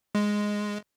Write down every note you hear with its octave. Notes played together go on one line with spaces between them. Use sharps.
G#3